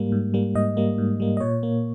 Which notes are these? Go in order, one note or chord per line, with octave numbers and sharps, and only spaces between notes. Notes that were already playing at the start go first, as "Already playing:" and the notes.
Already playing: G#2 G3 A#3
G#2
G3 A#3
G#2 D#5
G3 A#3
G#2
G3 A#3
D#5
A#2 C#5
A#3